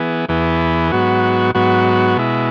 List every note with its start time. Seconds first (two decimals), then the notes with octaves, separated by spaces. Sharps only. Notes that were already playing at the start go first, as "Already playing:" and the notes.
Already playing: E3 B3 G#4
0.29 E2 E3 B3 G#4
0.92 G#2 F#3 B3 F#4
1.55 G#2 F#3 B3 F#4
2.17 B2 G#3 E4